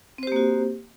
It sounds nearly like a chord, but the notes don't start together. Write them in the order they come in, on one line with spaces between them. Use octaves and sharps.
C4 C5 G4 A#3 F#4